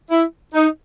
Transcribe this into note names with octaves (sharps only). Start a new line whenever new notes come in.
E4
D#4